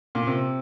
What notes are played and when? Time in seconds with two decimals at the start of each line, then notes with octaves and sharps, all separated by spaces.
0.15 A#2
0.27 C3